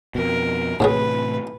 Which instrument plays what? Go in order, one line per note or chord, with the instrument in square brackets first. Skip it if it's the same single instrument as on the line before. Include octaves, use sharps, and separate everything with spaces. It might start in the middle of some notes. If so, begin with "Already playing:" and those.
[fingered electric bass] F2 B2 [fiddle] A#4
[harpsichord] D#2 F#3 G#4 [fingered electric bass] A2 C3 E3 [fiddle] B4